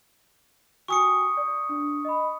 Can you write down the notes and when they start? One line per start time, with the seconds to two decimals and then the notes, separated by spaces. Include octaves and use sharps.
0.88 F#4 G5 G#5 C#6 D#6 C#7
1.37 D5
1.69 D4
2.05 D#5 B5